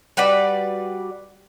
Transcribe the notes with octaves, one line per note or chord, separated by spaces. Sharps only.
G3 F#4 B4 D5